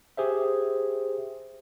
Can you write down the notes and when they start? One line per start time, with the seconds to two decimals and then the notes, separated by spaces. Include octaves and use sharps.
0.17 G4 G#4 C5 E5